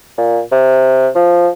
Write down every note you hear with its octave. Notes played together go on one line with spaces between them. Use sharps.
A#2
C3
F3